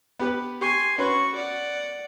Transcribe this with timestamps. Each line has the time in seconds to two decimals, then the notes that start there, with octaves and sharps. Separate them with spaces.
0.19 B3 G4 B4
0.61 G4 G#5 C6 C#6
0.98 C#4 F#4 B4 C6 C#6
1.35 D5 F#5